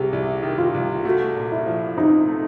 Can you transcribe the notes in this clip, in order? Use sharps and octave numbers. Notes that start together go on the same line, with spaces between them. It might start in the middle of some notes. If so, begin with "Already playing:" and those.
Already playing: C2 C3 G4 G#4
C2 E4
D#3
F4
C2
A3 F#4
A#2
E4
F3
C4 D#4
A3